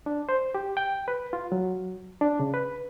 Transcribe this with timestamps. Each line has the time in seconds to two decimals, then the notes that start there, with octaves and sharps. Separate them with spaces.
0.06 D4
0.29 C5
0.55 G4
0.77 G5
1.08 B4
1.33 F4
1.52 F#3
2.21 D4
2.40 C#3
2.54 B4